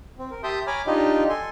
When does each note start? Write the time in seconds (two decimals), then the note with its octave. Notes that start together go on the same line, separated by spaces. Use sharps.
0.19 C4
0.31 A#4
0.43 G4 E5 A5 C6 D#6 G6
0.67 C#5 G#5 A#5 B5 D6 F6
0.87 D4 D#4 F4 G4 D#5
1.29 A4 G#5 C6